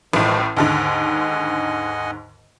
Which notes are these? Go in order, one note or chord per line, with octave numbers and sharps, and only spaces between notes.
A1 A2 D#3 F3 G#3
D#2 G#2 D3 D#5 F#5 G#5